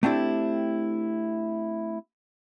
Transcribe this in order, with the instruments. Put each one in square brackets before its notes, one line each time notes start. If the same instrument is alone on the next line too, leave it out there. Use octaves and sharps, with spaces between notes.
[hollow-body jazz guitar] A3 C4 D4 E4 G4